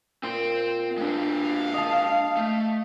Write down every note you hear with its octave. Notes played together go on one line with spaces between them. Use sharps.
A#2 C4 C6
G#3 D4 F5
D#5 A5
A3